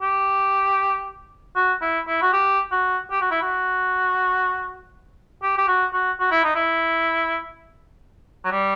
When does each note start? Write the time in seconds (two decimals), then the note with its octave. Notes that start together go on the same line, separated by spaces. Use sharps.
0.02 G4
1.55 F#4
1.82 E4
2.07 E4
2.22 F#4
2.33 G4
2.72 F#4
3.11 G4
3.21 F#4
3.31 E4
3.42 F#4
5.42 G4
5.58 G4
5.68 F#4
5.93 F#4
6.20 F#4
6.31 E4
6.44 D#4
6.55 E4
8.44 F#3
8.51 G3